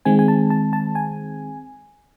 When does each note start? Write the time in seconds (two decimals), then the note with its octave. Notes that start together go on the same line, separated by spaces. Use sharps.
0.05 D#3 G#3 C4 G#5
0.19 G#5
0.28 A5
0.50 A5
0.73 A5
0.95 G#5